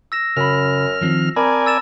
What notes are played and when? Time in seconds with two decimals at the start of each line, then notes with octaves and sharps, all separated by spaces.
0.12 E6 A#6 E7
0.36 F#2 C#3 B5 F6
1.01 D#3 F3 C4
1.36 C4 A#4 D5 G#5 A5 B5
1.66 E6 A6 E7